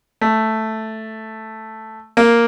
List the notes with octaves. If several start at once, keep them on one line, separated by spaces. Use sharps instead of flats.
A3
A#3